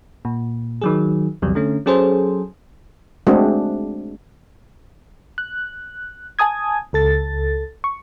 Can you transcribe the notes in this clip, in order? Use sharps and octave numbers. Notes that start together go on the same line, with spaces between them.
A#2
D#3 F#3 G#4
A#1 E2 C3 F#3 G3
D3 A3 C#4
F#3 C#4 G#4 A4 C5
G#3 A3 C4 D4 F#4 G#4
F#6
G#5 A5 D#6 G#6
C#2 A4 A6
C#6